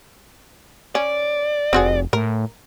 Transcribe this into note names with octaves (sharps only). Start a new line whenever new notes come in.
C#4 D5
F1 C4 F#4 G#4
A2 A#4